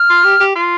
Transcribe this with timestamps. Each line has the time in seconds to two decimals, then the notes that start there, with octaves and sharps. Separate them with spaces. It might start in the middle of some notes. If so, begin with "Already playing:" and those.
Already playing: F6
0.10 F4
0.24 G4
0.40 G4
0.55 F4